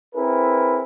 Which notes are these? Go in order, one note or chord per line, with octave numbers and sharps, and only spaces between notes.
C4 E4 G#4 A#4 B4